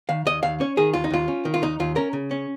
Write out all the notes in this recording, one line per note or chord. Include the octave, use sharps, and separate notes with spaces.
D#3 F5
D#2 D#5
D#2 F5
C#4 C#5
D#3 G#4
D#2 F4
D#4
D#2 F4
C#4
D#3
F4
D#2 D#4
D#2 F4
C#4 A#4
C#3
C#4